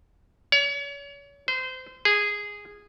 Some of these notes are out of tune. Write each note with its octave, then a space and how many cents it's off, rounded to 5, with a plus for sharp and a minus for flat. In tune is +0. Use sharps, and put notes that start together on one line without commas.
C#5 +35
C5 -25
G#4 -10